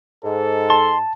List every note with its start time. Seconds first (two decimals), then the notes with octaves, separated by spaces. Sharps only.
0.24 G#2 A4
0.70 A5 C6